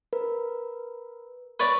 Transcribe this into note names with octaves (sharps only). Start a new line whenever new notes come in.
A#4 B4
B4 C#5 D5